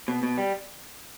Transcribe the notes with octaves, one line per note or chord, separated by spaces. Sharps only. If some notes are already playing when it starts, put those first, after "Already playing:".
B2
B2
G3